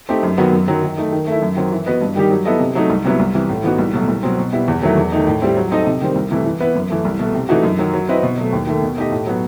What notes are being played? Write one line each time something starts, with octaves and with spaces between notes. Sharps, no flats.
A3 C4 D#4 G4
F#2
D#3 F#3 B3 F#4
F#2
D#3 F#3
D#3
A3 D#4
D#3
A3
E4
F#2
D#3 F#3 C4
E3
B3 F#4 B4 D#5
G2
D#3 G3 D#4 G4
F#3
B3 E4 A4 D#5
C3
F#3 A3 D#4
C2
C3 F#3 B3 E4
C2
C3 E3
A2
E3 B3 D#4 F#4
C2
B2 F#3 A3
C2
B2 F#3 C4
B2
G3 B3 E4
E2
D#3 F#3 A3 E4
E2
D#3 A3 D#4
A2
G3 C4 E4
F#3
C4 D#4 A4 D#5
C3
D#3 G3 C4
C2
C3 E3 A3 E4
E3
B3 E4 B4
F#2
E3 A3
C2
B2 A3
C3
E3 A3 D#4 F#4
F#2
D#3 F#3
F#3
C4 E4 B4 D#5
B2
F#3 A3
D#2
D#3 A3
B2
A3 D#4 G4 D#5
A2
F#3 B3